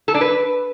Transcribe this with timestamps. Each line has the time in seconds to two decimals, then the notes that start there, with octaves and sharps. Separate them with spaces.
0.08 A4
0.14 D4
0.21 B4